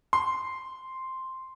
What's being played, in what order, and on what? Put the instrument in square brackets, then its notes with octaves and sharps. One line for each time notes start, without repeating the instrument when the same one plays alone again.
[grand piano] C6